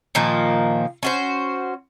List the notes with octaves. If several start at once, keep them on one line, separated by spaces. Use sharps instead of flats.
A#2 D#3 F3 A#3
C#4 F#4 C5